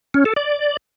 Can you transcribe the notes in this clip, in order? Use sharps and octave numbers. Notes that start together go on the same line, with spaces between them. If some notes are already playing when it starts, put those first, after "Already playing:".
C#4
A4
D5